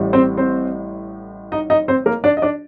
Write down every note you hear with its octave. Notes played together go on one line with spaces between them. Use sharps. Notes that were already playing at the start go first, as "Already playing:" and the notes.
Already playing: A1 A2 G3
C4 C5
C4 C5
D#4 D#5
D#4 D#5
C4 C5
A#3 A#4
D4 D5
D#5
D4 D5